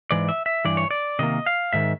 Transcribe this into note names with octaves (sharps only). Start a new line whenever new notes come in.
G#2 E3 D5
E5
E5
G2 E3 D5
C#5
D5
C3 D#3 A#3 D#5
F5
G#2 D#3 E5